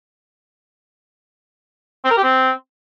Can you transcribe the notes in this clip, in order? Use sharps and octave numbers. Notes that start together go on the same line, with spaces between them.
C4
A#4
G4
C4